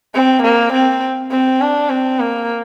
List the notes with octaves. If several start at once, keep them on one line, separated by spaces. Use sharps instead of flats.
C4
A#3
C4
C4
D4
C4
A#3